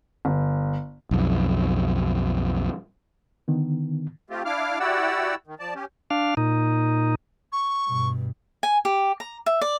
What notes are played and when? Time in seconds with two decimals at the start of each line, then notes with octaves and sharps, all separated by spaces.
0.25 G1
1.11 B1 F2
3.48 D3 D#3 B3
4.30 A3 C4 F4 G4
4.45 D4 E4 F5 D6 F6
4.80 E4 F#4 G4 D5 F#5 E6
5.47 D#3
5.59 F3 D5 A5
5.75 C#4 G4
6.10 D4 F5
6.37 A#2 D#4
7.52 C#6
7.88 G2 B2
8.63 G#5
8.85 G4
9.20 A#5
9.46 E5
9.61 D5